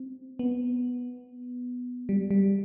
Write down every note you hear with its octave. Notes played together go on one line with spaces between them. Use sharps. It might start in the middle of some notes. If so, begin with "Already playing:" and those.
Already playing: C4
B3
G3
G3